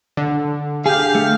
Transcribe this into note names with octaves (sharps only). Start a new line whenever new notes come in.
D3
G4 G#4 F5
A3